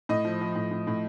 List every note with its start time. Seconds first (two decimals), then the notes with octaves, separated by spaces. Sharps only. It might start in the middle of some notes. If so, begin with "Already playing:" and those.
0.09 A2 D#5
0.25 F3
0.41 F3
0.56 A2
0.71 A2
0.87 A2